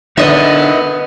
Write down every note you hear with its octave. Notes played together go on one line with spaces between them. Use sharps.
D3 B3 D#4 A#4 B4 D#5 E5